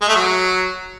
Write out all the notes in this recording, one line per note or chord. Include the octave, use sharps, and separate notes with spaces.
G#3
A3
F#3